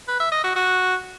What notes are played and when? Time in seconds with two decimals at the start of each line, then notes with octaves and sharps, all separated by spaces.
0.08 B4
0.20 E5
0.32 D#5
0.44 F#4
0.56 F#4